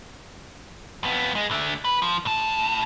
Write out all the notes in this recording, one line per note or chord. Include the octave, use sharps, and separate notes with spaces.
F2 B3
G#3
D3 A3
B4
F3
A2 A5